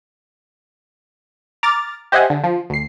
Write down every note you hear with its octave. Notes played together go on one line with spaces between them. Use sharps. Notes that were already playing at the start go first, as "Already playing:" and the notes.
A#5 D6 F6 A6
G4 C5 D#5 E5 F#5 G#5
D3
F3
D2 C7